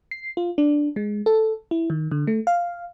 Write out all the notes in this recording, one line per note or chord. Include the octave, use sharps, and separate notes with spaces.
C7
F4
D4
G#3
A4
E4
D#3
D3
A3
F5